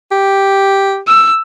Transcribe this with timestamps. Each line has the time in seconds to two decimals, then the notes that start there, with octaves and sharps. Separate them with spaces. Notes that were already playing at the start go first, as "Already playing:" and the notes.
0.11 G4
1.07 E6